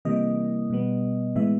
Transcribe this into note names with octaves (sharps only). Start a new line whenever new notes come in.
C3 E3 G3 A#3 D#5
B2 G3 B3
A2 E3 G#3 B3 E5